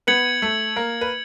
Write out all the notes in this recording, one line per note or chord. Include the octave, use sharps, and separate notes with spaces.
B3 B4 G#6 C#7 F#7
A3 A4
A#3 A#4
B4